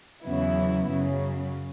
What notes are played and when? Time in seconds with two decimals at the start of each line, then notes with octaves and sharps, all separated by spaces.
0.25 E2 C#3 F#3 B3 E4
0.89 F#2 C#3 F#3